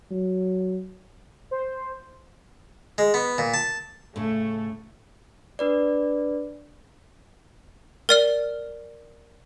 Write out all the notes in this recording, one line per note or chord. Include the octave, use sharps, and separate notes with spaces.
F#3
C5
G#3
B3
A#2
A5
A2 C#3 A3
D4 B4 D5
A#4 D5 F6